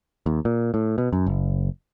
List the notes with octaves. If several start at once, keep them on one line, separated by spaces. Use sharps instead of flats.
D#2
A#2
A2
B2
F#2
F#1